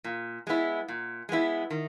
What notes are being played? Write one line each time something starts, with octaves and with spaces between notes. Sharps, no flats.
A#2
G#3 B3 E4
A#2
G#3 B3 E4
D#3